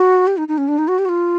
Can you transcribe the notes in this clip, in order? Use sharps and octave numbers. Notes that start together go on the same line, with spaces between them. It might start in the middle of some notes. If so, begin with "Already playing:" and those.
Already playing: F#4
G4
D#4
D#4
C#4
D4
D#4
F#4
G4
F#4
F4